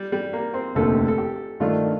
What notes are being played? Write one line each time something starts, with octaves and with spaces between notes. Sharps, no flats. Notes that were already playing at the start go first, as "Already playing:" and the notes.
Already playing: G3
G3
A#3
C4
F1 D#2 D3 A3 A4
A4
G4
G2 D#3 A3 D4 F4